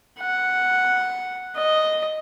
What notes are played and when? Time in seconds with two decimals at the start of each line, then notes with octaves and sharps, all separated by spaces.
0.20 F#5
1.57 D#5